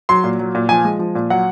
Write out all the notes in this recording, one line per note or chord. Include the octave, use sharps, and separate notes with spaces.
F#3 C6
A#2
F#3
A#2
F3 G#5
G#3
F3
A#2
F#3 F#5